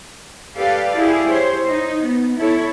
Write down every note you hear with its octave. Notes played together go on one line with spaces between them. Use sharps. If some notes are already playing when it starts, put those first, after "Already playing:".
G4 A4 B4 D5 F5
E4 G4 G#4
C5 C#5
D#4
B3
E4 A4 C#5